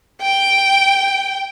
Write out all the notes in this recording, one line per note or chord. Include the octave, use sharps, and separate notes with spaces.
G5